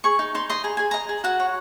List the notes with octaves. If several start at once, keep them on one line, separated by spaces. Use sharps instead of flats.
G#4 C#6
D#4
D#4 C6
D#5 C6
G#4 A#5
G#4 G#5
D#5 A#5
G#4
F#4 F#5
C#5